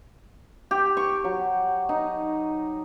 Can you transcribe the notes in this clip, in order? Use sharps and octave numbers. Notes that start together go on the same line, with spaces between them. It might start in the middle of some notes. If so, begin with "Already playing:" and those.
G4
C#6
F#3
D#4